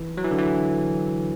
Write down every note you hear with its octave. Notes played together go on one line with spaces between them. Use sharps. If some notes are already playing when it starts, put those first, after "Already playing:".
Already playing: E3
F#3
E3
D3
E3